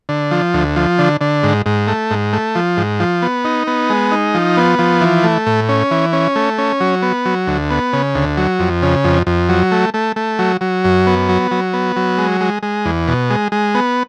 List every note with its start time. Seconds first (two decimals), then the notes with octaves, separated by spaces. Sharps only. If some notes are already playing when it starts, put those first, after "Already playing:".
0.09 D3
0.31 F3
0.54 D2
0.76 F3
0.99 D3
1.21 D3
1.43 G#2
1.66 G#2
1.87 A3
2.11 G#2
2.33 A3
2.55 F3
2.77 G#2
3.00 F3
3.22 B3
3.45 D#4
3.67 B3
3.90 G#3
4.12 D#4
4.35 F3
4.57 B3
4.79 F3
5.01 E3
5.24 A3
5.46 A2
5.69 C#4
5.91 E3
6.13 C#4
6.36 A3
6.58 C#4
6.80 F#3
7.02 B3
7.25 F#3
7.47 D2
7.70 B3
7.93 C#3
8.15 D2
8.37 F#3
8.60 F2
8.82 C#3
9.04 F2
9.27 F2
9.49 F#3
9.72 A3
9.94 A3
10.16 A3
10.39 F#3
10.61 F#3
10.84 F#2
11.07 B3
11.29 F#3
11.51 F#3
11.73 B3
11.96 F#3
12.18 G#3
12.41 G#3
12.63 G#3
12.85 E2
13.08 B2
13.30 G#3
13.52 G#3
13.75 B3